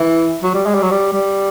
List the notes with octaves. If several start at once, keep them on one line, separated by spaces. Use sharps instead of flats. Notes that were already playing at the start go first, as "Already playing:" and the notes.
Already playing: E3
F#3
G3
G#3
G3
F#3
G3
G3